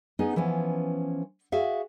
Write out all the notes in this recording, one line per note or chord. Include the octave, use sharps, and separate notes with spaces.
B3 C#4 D#4 G#4 D#5
E3 F3 B3 C#4
F#4 G#4 E5 F5